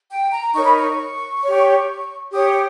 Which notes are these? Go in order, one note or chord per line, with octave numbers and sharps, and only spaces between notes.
G5
A#5
D#4 A#4 C#5 C#6
B5
C#6
C#5
G4
G4 C#5 D#6